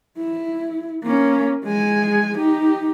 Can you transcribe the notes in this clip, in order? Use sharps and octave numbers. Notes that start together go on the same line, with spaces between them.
E4
A#3 C#4
G#3 G#5
D#4 G4